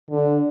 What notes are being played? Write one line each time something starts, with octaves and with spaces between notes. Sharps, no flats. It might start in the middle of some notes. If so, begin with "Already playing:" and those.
D3